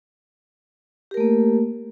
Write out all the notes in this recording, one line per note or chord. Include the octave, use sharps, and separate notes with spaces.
A3 A#3 G4 A#4